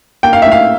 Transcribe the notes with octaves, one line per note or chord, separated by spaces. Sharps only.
A#3 G5
F5
A2 E5
F5